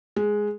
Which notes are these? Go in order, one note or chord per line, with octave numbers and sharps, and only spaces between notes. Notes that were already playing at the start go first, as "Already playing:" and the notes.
G#3